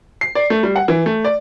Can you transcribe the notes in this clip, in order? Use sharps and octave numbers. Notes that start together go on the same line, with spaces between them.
C7
D5
A3
G3
F#5
E3
A3
D5